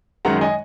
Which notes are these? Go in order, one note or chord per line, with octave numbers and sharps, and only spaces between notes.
F#2 D#3 G#3 F#5 A#5
D#5 G#5